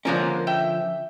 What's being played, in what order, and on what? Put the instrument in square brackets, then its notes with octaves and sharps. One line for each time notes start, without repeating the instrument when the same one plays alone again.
[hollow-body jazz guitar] D3 F3 C#4 [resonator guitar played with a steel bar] G#3 A#3 A#4
[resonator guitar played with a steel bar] E5 G5